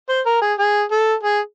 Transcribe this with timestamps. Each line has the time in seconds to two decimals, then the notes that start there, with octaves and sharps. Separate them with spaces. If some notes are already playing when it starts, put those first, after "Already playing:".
0.09 C5
0.26 A#4
0.42 G#4
0.59 G#4
0.91 A4
1.24 G#4